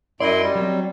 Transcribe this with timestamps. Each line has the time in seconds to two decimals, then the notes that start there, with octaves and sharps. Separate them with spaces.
0.20 F#2 E4 D5 D#5 C6
0.43 G3
0.55 F#3 C4